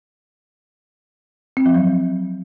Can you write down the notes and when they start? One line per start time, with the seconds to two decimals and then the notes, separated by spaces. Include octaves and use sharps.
1.57 C4
1.66 F3
1.74 F#3